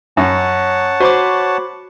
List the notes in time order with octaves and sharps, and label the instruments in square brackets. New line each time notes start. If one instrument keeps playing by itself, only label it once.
[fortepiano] F#2 [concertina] C#5 F#5 A5
[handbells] F#4 B5 D6 [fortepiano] C5